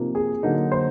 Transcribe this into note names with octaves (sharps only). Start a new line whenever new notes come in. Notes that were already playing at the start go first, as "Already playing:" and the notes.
Already playing: C3 F3 A#3 D#4
G#4
D3 F#3 A#3 D#4
C5